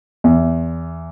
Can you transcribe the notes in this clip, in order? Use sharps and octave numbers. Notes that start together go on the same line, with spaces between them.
E2